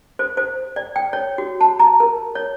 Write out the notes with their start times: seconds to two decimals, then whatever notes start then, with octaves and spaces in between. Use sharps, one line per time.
0.19 C5
0.37 C5
0.76 D5
0.96 G5
1.13 C#5
1.38 F#4
1.61 A5
1.79 A#5
2.00 A#4
2.35 C#5